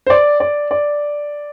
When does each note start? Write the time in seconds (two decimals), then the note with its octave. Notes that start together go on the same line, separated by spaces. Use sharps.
0.07 C5
0.10 D5
0.40 D5
0.71 D5